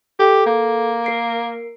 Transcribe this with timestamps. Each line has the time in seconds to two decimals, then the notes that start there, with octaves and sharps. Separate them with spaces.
0.19 G4 A4
0.46 A#3
1.04 A#4 C7 D7